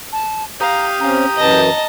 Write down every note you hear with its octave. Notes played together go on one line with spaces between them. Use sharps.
A5
G4 F5 A#5 D#6
C3 C#4 A#5
F#2 E3 D#5 A5